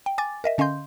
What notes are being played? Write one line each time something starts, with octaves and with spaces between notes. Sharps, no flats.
G5
G#5 D6 A6
A#4 D#5 E5
D3 C#4 D#5 F5 C6 G6